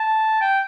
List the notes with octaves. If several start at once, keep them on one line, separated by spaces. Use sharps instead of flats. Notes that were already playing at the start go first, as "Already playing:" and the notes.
Already playing: A5
G5